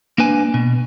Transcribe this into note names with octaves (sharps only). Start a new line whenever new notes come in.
A#3 D4 B4 G#5
B2